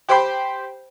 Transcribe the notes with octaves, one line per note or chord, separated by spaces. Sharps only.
G4 C5 G5 B5 C6